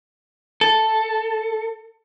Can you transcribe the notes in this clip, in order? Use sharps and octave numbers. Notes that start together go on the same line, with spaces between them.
A4